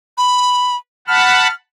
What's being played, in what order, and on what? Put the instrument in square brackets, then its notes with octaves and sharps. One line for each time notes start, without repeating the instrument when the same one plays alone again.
[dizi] B5
[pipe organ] F#5 A5 B5 [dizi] F6